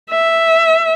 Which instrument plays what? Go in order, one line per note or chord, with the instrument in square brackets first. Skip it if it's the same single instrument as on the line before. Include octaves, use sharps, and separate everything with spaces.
[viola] E5